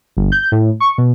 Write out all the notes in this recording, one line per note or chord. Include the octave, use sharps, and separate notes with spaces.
G1
G6
A2
C#6
B2